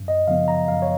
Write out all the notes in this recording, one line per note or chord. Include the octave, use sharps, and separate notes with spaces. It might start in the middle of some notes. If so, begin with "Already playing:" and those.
Already playing: F#2
D#5
C#3 F3 B3 F5
A#5
F#2 F5
C#5